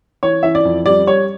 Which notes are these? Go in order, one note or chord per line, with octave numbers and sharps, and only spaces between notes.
E3 C#5
E3 E5
D5
F2
G3 D5
G3 C#5